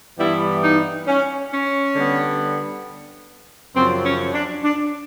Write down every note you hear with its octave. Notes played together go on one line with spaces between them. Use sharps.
G2 E3 G3 B3 E4
D#4
C#4
C#4
D3 G3 B3
F#2 C#3 F3 C4
C#4
D4
D4